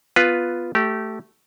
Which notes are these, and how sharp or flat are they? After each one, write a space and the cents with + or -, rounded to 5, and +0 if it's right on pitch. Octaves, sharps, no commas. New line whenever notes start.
B3 +0 F4 +0 B4 +0
A3 +0 G4 -25